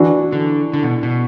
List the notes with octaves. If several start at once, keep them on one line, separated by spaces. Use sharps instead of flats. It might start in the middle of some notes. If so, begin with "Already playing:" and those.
Already playing: E3 D4 F#4
D3
D3
B2
B2